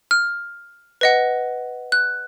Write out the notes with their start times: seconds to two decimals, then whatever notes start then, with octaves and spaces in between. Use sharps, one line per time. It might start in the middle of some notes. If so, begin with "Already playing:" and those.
0.11 F6
1.01 B4 D#5 F#5
1.92 F#6